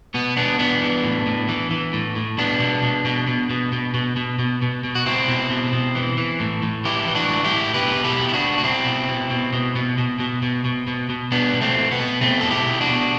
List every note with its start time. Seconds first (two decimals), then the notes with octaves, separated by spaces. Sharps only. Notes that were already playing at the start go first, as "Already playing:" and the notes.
0.14 B2 B3
0.37 B2 B3 D4
0.59 E3 B3 D4
0.82 E3
1.04 A2
1.26 A2
1.49 E3
1.71 E3
1.93 A2
2.16 A2
2.38 B2 B3 D4
2.60 B2
2.83 B2
3.05 B2
3.27 B2
3.50 B2
3.73 B2
3.94 B2
4.16 B2
4.39 B2
4.62 B2
4.84 B2
4.95 F#4
5.06 B2 C4 E4
5.29 B2
5.50 B2
5.73 B2
5.95 E3
6.18 E3
6.40 A2
6.63 A2
6.85 E3 E4 G4
7.07 E3
7.15 D4 F#4
7.30 A2
7.44 E4 G4
7.52 A2
7.74 B2 G4 B4
7.97 B2
8.04 E4 G4
8.19 B2
8.29 E4
8.34 D4 F#4
8.42 B2
8.58 F#4
8.63 B2 C4 E4
8.86 B2
9.08 B2
9.31 B2
9.53 B2
9.76 B2
9.98 B2
10.20 B2
10.43 B2
10.65 B2
10.88 B2
11.10 B2
11.32 B2 B3 D4
11.54 B2
11.61 A3 C4
11.77 B2
11.91 B3
12.00 B2
12.21 B2 A3 C4
12.41 B2 A4
12.51 E4 G4
12.66 B2
12.81 D4 F#4
12.88 B2